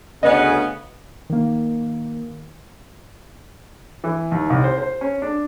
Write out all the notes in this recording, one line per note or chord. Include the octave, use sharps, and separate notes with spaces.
D2 C#3 B3 D#5
D#3 A#3
E3
D#2
C2
C5
C5
C#4
D4